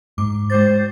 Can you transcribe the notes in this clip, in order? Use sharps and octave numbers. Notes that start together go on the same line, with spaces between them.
G#2 D6
G#3 C5 D6 A6